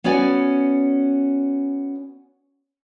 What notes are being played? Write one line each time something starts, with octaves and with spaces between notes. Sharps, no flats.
B3 C#4 F#4 D5 G#5